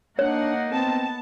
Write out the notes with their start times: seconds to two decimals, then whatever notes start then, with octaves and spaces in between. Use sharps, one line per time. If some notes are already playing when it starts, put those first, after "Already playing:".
0.19 A#3 D4 D#4 C#5 F#5
0.71 B3 C4 A5